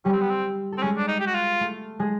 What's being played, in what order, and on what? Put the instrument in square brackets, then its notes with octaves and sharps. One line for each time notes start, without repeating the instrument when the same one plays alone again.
[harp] G3 G4 [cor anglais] C#4
[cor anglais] C4
B3
C4
[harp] A4
[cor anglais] C4
[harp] G#3 G#4 [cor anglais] C#4
[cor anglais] D4
D#4
G4
F#4
F4
[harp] A3 A4
G#3 G#4